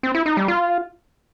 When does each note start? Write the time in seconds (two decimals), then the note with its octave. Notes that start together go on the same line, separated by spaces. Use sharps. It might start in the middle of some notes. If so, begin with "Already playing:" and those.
0.03 C4
0.15 E4
0.26 D#4
0.37 G3
0.48 F4